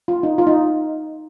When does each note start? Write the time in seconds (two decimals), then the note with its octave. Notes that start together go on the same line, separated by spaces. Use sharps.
0.08 F4
0.23 D#4
0.38 F4
0.47 D#4